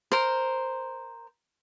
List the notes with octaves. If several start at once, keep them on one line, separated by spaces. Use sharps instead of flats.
A#4 C5